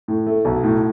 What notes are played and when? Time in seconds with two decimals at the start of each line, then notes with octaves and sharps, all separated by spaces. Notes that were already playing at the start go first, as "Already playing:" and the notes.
0.08 A2
0.26 A3
0.45 B1
0.63 A2